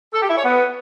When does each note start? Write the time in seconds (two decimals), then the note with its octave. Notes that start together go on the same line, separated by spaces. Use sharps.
0.13 A4
0.21 G4
0.28 E4
0.36 C#5
0.43 B3